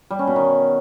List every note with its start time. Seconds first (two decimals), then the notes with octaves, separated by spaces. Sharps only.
0.10 G3
0.19 C#4
0.27 B2
0.36 D#3